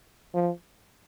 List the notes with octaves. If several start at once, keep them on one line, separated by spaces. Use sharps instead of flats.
F3